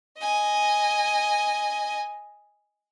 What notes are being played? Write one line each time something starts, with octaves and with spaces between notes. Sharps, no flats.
D#5 G#5